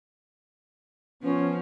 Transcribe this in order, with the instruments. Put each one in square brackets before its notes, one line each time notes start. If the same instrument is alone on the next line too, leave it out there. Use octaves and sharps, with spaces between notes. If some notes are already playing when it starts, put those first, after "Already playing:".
[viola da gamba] F3 [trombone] B3 [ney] C#4